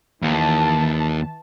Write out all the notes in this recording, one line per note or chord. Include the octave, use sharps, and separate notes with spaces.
D#2 E3 A5